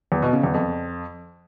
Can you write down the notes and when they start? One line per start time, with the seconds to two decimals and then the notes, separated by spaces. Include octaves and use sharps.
0.12 E2
0.22 B2
0.33 C#3
0.43 E2
0.54 F2